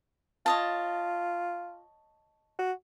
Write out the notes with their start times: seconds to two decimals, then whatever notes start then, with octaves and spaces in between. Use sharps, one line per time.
0.46 F4 C#5 D#5 A5
2.59 F#4